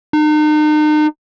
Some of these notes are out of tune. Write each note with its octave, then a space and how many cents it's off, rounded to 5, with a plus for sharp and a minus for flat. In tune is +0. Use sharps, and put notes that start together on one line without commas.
D#4 -40